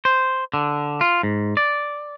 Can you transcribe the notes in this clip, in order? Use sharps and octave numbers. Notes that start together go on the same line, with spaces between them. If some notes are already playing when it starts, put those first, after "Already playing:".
C5
D3
F4
G#2
D5